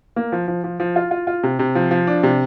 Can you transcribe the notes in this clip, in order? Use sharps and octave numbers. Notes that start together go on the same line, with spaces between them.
A#3
F3
F3
F3
F3
F4
F4
F4
C3
C3
F3
F3
D4
C3